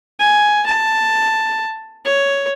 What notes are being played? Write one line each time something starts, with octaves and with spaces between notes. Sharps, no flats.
G#5
A5
C#5